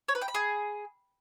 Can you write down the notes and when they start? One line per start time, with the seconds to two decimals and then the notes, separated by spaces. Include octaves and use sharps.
0.08 C#5
0.15 B4
0.21 G5
0.28 B5
0.34 G#4